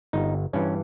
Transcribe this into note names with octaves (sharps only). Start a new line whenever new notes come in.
G1 D#4
G2 E3 C#4